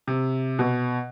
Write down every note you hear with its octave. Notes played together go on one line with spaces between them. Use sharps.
C3
B2